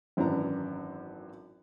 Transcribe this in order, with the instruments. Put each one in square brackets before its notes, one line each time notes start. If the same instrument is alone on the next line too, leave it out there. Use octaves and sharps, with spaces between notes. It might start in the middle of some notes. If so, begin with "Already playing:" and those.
[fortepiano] G#1 F#2 E3 D4 A#5